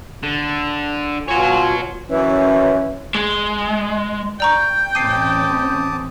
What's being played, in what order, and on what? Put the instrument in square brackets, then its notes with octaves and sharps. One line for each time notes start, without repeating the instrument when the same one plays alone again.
[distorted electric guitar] D3
[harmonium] B2 F4 G#5 [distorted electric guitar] C#5 F#5
[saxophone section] F#2 E3 [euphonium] C#4
[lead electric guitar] G#3
[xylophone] D5 A#5 C#6 [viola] G5
[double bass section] A1 C4 C#4 [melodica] A5 D6 D#6 [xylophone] C7 D#7